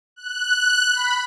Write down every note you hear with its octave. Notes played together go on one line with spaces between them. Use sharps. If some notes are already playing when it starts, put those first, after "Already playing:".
F#6
B5